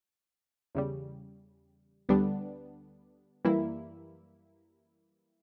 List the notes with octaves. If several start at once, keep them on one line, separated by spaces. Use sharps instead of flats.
E2 C#3 G3
D2 D3 G3 B3 D4
F#2 E3 G3 A#3 E4